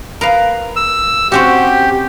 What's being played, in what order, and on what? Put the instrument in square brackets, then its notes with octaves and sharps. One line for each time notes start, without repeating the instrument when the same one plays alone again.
[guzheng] A#4 B4 F5
[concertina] E6
[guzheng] C4 C#4 F#4 [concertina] G4